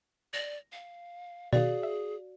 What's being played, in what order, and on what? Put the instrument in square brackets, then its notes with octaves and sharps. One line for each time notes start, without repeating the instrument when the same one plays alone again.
[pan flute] D5 [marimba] A#6
[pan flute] F5
[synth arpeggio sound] B2 D#3 [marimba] F#4 F5 [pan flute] G#4 [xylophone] D5
[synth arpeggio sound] E5